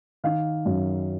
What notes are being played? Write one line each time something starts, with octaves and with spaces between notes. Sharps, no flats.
D#3 F5
F#2